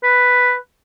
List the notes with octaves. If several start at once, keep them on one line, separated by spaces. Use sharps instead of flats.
B4